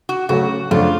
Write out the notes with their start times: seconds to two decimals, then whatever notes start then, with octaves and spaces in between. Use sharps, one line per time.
0.09 F#4
0.29 C#3 F#3 A3 C#4 F#4
0.71 F#2 C#3 F3 A3 D4 F4